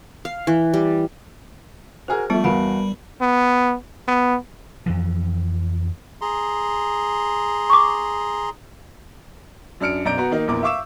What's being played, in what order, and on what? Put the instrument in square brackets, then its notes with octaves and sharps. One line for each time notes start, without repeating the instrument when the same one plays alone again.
[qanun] F5
E3
G3
[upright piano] F#4 G#4 A#4 [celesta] C5 F6
[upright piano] F3 A3 [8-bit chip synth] G3 [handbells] B3 A5
[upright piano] E2 F#4 F5 [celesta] A#4 B5 D7
[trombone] B3
B3
[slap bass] F2 E3 F3
[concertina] G#4 A#5 C6
[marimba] C#6 D6
[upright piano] F#2 D4 F6 C#7 D7
B1 F#2 D5 A#5 G6 D7
B3 F#4 A#5
D#3 A#3 D#4
A#1 E2 A#4 D6
E5 F5 C#6 D6 E6 E7